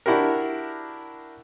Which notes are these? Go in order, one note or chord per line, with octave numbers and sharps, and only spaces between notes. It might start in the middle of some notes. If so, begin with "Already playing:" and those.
D4 E4 F#4 G4 A#4